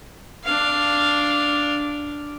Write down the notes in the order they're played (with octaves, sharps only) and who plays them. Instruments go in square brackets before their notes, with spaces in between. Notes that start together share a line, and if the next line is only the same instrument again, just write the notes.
[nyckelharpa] D4 F5